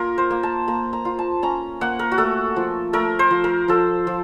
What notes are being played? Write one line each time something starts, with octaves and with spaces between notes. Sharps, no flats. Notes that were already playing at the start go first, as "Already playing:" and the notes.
Already playing: A#3 F4 A#4
C5
A#3
A5
A#3 A#5
A#5
F4
A5
C#4 A#5
A#3 F#5
A#4
F#4
A3 A4
F3
A3 A#4
C5
F3
A#4
F3 A4
F3